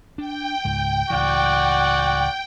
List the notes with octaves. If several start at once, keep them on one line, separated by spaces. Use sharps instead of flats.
D4 G5
C#2 G#2
C#2 A2 E3 F#4 D5 F#5